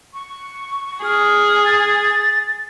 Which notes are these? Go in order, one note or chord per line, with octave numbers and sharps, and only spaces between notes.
C#6
G#4 F6
A6